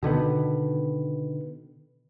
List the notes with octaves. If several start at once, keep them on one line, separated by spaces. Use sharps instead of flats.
B2 D3 D#3 B3